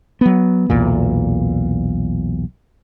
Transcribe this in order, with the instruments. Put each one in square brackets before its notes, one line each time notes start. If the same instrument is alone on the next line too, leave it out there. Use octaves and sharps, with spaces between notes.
[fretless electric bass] F#3 B3
B1 E2 A#2